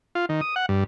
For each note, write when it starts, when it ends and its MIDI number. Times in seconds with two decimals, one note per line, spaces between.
0.15 0.26 65
0.29 0.41 51
0.41 0.55 87
0.56 0.66 78
0.69 0.84 43